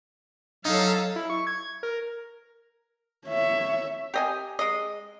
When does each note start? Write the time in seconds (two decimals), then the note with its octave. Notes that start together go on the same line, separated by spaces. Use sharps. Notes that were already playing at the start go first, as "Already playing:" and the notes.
0.65 F#3 C#4 D#4 A4 F5
1.16 E4
1.30 C#6
1.47 G#6
1.83 A#4
3.27 C#5 E5
4.14 G4 D#5 G#5
4.59 G#3 D#5